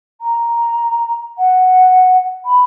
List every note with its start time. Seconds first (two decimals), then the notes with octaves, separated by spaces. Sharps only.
0.21 A#5
1.38 F#5
2.45 B5